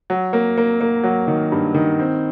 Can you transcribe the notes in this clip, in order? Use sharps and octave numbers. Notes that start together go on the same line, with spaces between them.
F#3
A#3
A#3
A#3
F#3
D#3
G2
D#3
C4